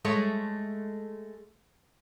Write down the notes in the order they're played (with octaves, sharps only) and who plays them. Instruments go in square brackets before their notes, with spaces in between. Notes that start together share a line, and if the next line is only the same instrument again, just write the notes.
[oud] G#3 A3 C#5